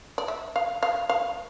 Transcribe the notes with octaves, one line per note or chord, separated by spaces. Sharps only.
D5
E5
F5
F5
F5